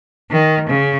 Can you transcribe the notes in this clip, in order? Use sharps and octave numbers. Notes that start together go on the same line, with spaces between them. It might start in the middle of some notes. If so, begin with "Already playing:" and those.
D#3
C#3